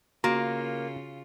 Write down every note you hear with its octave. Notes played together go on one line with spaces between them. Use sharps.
C#3 A#3 F4 F#4 A#5